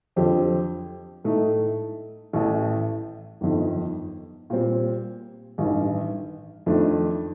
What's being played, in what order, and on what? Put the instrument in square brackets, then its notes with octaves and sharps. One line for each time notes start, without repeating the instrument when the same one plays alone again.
[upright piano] F2 D3 F3 C4 G4
A2 A3 D#4
A1 A2 A3
G1 F2 D#3
A#2 G3 C4
A1 G2 D#3
F2 D#3 A3 D4